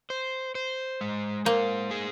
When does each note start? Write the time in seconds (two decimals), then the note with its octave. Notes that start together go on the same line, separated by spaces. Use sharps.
0.10 C5
0.55 C5
1.01 G#3
1.45 A#3 C5
1.91 G#4